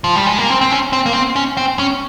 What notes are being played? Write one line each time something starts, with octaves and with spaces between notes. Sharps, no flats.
F3
G3
G#3
A#3
C4
C4
C#4
C4
A#3
C4
C#4
C4
C#4